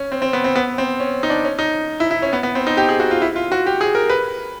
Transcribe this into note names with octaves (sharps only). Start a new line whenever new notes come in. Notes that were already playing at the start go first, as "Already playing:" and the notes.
Already playing: C#4
C4
C4
B3
C4
B3
C4
C#4
D#4
D4
C#4
D#4
E4
E4
C#4
B3
B3
C4
D#4
G4
G#4
F#4
F4
E4
F4
F#4
G4
G#4
A#4
B4